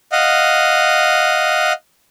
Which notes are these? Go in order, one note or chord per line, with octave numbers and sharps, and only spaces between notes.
D#5 F5 F#5